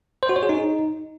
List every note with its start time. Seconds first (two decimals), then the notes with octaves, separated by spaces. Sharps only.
0.23 C5
0.29 F#4
0.36 C#5
0.43 G#4
0.49 D#4